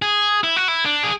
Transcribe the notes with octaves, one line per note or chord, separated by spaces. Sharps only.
G#4
E4
F#4
E4
D4
G#4